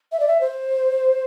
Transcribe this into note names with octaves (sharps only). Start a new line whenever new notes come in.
E5
D5
E5
C5